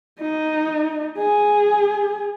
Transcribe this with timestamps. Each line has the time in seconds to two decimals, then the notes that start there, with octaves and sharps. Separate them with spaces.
0.20 D#4
1.18 G#4